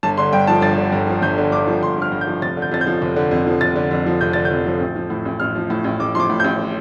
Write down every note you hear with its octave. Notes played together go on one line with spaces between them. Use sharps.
G1 A5
D3 C6
G2 G5
F3 A5
G1 A6
D3
G2
F3
G1 G6
D3
G2 D6
F3
G1 C6
D3 F6
G2
G6
F3
F1 A6
D3
G6
F2 A6
G6
F3
F1
D3
F2
F3
F1 A6
D3
F2
F3
F1 G6
D3 A6
G6
F2
F3
A1
F3
A2
A1
A1 F6
F3
A2
A1
A1 D6
F3 C6 D6
A2
A1 G6